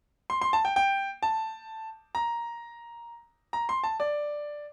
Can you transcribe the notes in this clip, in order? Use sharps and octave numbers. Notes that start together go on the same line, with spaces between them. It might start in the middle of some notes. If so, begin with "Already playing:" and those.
C6
C6
A5
G5
G5
A5
A#5
A#5
C6
A5
D5